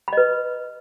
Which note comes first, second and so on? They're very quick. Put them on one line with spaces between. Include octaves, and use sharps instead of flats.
B5 D#5 B4